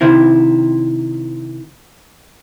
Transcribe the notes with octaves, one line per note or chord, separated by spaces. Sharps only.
C3 D#3 E4